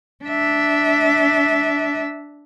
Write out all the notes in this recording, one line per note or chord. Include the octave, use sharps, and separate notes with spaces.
D4 E5